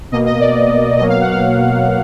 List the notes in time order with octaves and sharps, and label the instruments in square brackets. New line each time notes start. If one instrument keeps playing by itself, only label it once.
[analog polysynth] B2 A#3 D#5
D#5
D5
B2 F#3 A#3 D#5
F5
F#5
F5